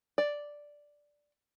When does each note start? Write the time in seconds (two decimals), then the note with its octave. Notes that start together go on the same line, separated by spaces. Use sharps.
0.18 D5